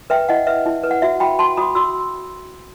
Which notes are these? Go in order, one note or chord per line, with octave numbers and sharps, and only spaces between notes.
B4 E5 G5
E4 D#5 F#5
B4 E5
E4
B4
F#5
F#4 E5
F#4 G5 B5
F#4 A5 C6
F#4 B5 D#6
F#4 C6 E6